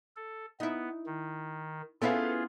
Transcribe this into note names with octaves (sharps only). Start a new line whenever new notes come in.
A4
B3 D#4 E4
D#3
B3 C#4 E4 F4 G#4 A4 F5